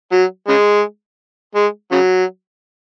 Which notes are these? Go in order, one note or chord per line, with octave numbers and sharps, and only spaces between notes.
F#3
C#3 G#3
G#3
C#3 F#3